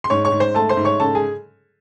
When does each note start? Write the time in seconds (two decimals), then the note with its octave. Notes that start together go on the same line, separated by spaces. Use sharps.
0.04 C6
0.10 G#2 C#5 C#6
0.25 C#5 C#6
0.32 G#2
0.40 C5 C6
0.54 A3 A4 A5
0.69 C5 C6
0.77 G#2
0.85 C#5 C#6
1.00 C#3 A4 A5
1.15 G#4 G#5